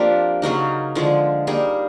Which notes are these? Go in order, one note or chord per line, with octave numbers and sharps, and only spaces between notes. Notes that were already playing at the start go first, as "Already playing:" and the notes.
Already playing: F3 A#3 C4 D4 G4
C#3 F#3 A#3 D#4
D3 F3 G#3
G3 A#3 D#4 G#4